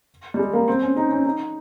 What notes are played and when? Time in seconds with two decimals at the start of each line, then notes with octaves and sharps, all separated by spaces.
0.34 G3
0.39 G#3
0.53 A#3
0.68 C4
0.82 C#4
0.96 D#4
1.11 C#4
1.25 D#4